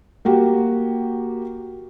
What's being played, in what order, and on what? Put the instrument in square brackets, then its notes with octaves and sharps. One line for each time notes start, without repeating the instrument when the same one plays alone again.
[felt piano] A#3 F#4 G4